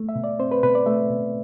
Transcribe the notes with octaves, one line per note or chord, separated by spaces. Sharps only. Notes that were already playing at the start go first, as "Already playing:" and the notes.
Already playing: A3
E5
B2
D5
C4 C5
B4
B2 B4
D5
A3 E5
B2